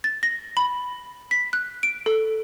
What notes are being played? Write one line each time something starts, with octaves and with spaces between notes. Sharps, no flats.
A6
A#6
B5
B6
F#6
D7
A4